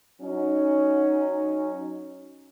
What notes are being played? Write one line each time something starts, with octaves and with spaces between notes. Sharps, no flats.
F#3 C#4 D#4